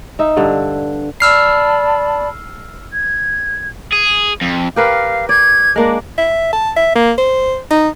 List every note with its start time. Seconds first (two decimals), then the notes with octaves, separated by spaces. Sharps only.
0.19 D#4 E5
0.37 G2 D3
1.20 D5 A5 B5 E6 F6 C7
2.93 G#6
3.92 G#4
4.41 F2
4.76 G4 A#4 B4 F5
5.29 D5 G#6
5.76 G#3 A#3 D4
6.18 E5
6.53 A5
6.76 E5
6.95 A#3
7.18 C5
7.70 D#4